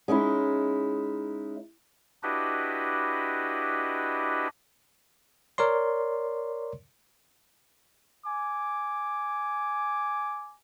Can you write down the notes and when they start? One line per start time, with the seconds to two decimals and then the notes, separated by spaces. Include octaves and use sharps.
0.08 G#3 C#4 D#4 E4
2.23 D4 E4 F#4 G4 B4 D#5
5.58 A#4 C#5 D5 C6
8.25 G#5 D6